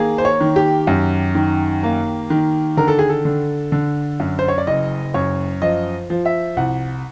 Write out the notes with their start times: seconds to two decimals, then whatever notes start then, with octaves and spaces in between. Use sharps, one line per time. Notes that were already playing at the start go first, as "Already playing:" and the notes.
Already playing: D#3 A#3 G#4
0.18 C5
0.25 C#5
0.41 D#3
0.56 G4
0.87 F#2
1.35 D#3
1.83 A#3
2.30 D#3
2.77 D3 A#4
2.88 A4
2.99 G#4
3.09 A4
3.25 D3
3.72 D3
4.20 F#2
4.39 C5
4.48 C#5
4.58 D5
4.67 F#1 D#5
5.14 F#2 C#5
5.62 F3 D#5
6.10 F3
6.25 E5
6.57 C2 F#5